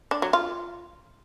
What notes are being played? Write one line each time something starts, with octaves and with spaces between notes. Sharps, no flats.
D4
F#3
F4